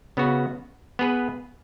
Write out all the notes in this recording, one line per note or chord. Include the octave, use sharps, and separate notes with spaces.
C#3 B3 F#4
B3 G#4 B4